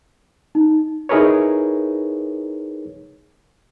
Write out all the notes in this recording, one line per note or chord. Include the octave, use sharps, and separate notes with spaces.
D#4
D#4 E4 G#4 A#4 B4 C#5